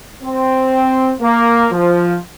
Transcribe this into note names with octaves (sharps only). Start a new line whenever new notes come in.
C4
A#3
F3